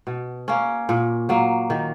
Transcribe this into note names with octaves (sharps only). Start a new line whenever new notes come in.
B2
A#3 C#4
A#2
F#3 A#3
D#3